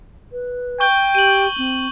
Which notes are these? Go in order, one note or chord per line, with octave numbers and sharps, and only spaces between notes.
B4
G5 C#6 G6 G7
G4 D#7 F#7
C4